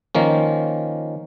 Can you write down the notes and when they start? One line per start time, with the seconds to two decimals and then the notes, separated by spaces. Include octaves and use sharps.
0.15 D#3 F3 A#3 C#4